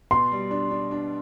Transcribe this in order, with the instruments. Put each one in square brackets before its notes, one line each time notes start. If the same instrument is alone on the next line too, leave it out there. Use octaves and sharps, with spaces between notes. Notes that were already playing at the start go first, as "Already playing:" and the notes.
[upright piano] B2 [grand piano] C6
[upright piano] G3
D4
D4
D4